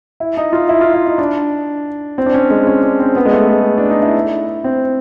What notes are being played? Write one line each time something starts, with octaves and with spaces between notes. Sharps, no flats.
E4
D#4
F4
E4
F4
E4
D#4
D4
C4
D4
C#4
G#3
C#4
D4
C4
B3
G#3
A3
G#3
D4
D#4
E4
C4